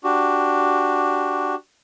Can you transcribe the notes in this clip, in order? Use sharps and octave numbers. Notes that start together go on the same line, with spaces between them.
D4 F#4 G4